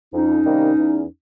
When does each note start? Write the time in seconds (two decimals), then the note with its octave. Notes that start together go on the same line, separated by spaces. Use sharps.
0.13 F2 C#4 D#4
0.45 C3 D#3 G3 A#3
0.78 E2